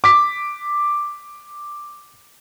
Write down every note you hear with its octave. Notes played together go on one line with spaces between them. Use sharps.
D6 B6